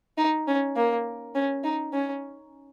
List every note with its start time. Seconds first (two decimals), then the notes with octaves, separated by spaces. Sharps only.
0.18 D#4
0.48 C#4
0.76 A#3
1.35 C#4
1.64 D#4
1.93 C#4